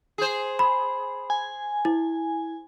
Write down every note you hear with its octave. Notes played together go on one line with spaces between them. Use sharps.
G#4 C5
B5
G#5
E4